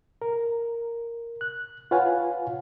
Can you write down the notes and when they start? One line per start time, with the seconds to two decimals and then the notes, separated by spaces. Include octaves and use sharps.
0.22 A#4
1.41 F#6
1.91 F4 B4 C#5 F5 F#5 G#5